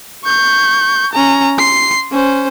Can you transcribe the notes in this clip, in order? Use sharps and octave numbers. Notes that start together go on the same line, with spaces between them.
C#6 G6
C#4 A#5
C6 C7
C#4 C5